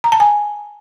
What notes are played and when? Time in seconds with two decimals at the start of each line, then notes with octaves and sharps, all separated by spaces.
0.04 A#5
0.12 A5
0.20 G#5